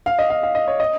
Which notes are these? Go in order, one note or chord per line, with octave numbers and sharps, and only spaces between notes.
F5
D#5
F5
F5
D#5
C#5
D#5